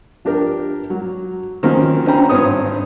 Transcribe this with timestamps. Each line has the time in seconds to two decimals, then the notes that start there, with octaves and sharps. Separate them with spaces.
0.25 F3 D4 G4 A#4
0.90 F#3
1.63 D#3 F3 F#3 A#3 C4 C#4
2.06 D3 C#4 C5 G5 A#5 B5
2.29 G#1 G2 C4 B4 C#5 D#6